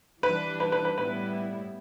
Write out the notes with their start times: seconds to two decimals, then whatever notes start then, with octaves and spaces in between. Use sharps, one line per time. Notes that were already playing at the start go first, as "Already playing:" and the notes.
0.23 E3 G3 D4 B4
0.60 B4
0.72 B4
0.85 B4
0.97 A2 G3 B3 E4 B4